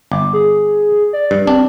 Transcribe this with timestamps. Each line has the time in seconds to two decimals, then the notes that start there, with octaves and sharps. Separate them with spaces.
0.12 G1 D6
0.33 G#4
1.13 D5
1.31 G2
1.47 C4 D4